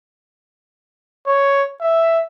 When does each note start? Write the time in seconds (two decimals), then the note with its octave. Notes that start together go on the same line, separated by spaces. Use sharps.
1.27 C#5
1.81 E5